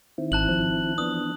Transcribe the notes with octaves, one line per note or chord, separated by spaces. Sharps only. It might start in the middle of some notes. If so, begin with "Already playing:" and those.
D#3 C4 E4
G#1 A5 F#6 F#7
F3
E3 B3 D4 D#6